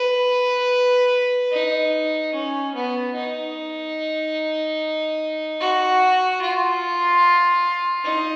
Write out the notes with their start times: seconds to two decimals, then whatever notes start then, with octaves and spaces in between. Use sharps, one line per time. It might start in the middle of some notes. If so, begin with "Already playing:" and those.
Already playing: B4
1.53 D#4
2.34 C#4
2.75 B3
3.15 D#4
5.60 F#4
6.41 F4
8.04 D#4